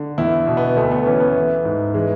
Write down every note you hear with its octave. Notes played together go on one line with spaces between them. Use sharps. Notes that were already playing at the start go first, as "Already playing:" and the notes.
Already playing: D3
E2 E4
B2
B3
D2 A3
B3
E3 C#4
B3
E3
G#2
E3 G#3